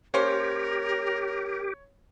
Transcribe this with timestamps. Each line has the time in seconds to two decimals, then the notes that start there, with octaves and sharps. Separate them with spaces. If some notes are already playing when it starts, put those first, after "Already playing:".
0.14 A#3 C#4 G4 A#4 C5 C#5